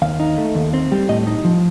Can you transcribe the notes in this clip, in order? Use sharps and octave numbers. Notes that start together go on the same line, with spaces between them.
D#2 F5
D#4
A3
D#2
C4
G3
A2 D#5
D#4
F3